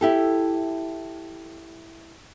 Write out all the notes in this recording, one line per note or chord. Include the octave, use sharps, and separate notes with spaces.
E4 G4 A4